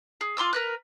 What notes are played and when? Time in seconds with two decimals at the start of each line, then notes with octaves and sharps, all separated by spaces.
0.21 G#4
0.37 F4 C6 D6 E6
0.53 A#4 B4 F#6